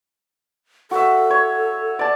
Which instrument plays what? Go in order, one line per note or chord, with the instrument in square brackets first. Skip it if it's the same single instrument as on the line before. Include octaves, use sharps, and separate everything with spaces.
[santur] F#4 E5 [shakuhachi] A4
[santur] C#5
D5 A5